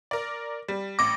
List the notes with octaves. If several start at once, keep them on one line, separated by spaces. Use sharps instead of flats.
A#4 D5
G3
A1 D6 A#6